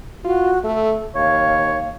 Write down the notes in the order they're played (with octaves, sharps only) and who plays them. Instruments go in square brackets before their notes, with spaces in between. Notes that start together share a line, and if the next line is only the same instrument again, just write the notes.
[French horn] F4 [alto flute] F#4
[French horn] A3 [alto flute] A4
[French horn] D#2 [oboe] C#5 [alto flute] F5